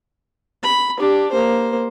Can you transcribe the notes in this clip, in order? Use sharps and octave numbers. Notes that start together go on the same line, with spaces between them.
B5
D4 G4
A#3 C5